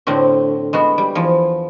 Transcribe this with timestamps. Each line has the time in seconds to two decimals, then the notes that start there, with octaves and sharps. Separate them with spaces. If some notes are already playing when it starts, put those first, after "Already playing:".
0.07 A2 D3 C4 F#4
0.73 G#3 B3 F#4
0.98 G3
1.15 E2 F3